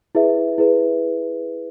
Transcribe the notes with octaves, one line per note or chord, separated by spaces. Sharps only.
E4 G#4 B4 E5
E4 G#4 B4 E5